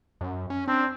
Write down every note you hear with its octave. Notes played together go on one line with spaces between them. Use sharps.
F#2
C#4
C4 D4